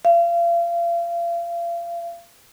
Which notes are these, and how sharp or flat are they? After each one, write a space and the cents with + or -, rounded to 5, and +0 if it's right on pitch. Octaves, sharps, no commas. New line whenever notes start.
F5 -35